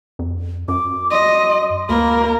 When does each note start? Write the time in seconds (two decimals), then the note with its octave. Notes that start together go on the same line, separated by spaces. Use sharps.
0.19 F2
0.68 F#2 D6
1.11 D#5 C6
1.89 D2 A#3 A#4 B5